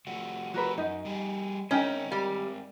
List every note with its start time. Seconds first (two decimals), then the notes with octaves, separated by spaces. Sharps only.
0.07 F3 A3 F#4
0.54 F3 A3 F#4 A#4 B4
0.78 F#2 D#4
1.05 G3 G#4
1.71 G#3 C4 C#4 D#4 A#4 G5
2.12 G3